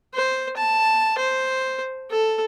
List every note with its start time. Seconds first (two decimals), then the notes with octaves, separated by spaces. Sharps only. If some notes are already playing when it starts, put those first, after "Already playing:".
0.14 C5
0.57 A5
1.18 C5
2.11 A4